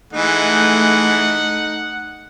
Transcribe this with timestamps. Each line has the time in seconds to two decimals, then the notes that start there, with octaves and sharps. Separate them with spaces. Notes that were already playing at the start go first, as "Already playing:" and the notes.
0.13 E3 G#3 A3 D#4 F#5